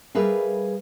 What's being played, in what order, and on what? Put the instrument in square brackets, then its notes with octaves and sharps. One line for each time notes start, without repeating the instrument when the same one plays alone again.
[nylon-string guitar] G3 G#4 A#4 B4 E5 F5